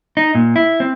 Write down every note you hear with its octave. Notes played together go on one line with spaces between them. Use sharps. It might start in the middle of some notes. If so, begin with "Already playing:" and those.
D#4
A#2
E4
C4